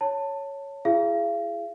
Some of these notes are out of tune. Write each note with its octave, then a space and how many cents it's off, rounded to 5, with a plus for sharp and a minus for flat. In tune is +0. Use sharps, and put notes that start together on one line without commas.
C#5 +0 A5 +20
E4 +35 G#4 +0 F5 -40